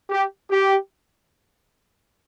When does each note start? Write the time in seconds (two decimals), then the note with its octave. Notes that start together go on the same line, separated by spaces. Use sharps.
0.10 G4
0.50 G4